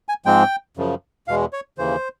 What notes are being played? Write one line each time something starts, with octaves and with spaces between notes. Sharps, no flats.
G#5
G#2 F3 G#3 C4 G5
F#2 C#3 F3
E2 B2 G#3 F5
C#5
D#2 C#3 E3 C5